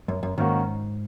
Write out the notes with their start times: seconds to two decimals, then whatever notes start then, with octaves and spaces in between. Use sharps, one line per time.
0.08 F#2
0.23 F#2
0.38 G#2 D#3 A#3 C#4 F#4